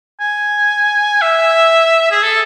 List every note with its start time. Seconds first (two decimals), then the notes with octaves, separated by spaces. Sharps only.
0.20 G#5
1.21 E5
2.11 G#4
2.23 A4